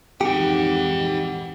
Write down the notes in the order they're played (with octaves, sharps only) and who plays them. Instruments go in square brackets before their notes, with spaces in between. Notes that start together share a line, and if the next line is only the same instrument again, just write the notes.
[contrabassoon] G#1 [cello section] F2 G#2 E3 [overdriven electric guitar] D#4 F#5 [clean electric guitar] G4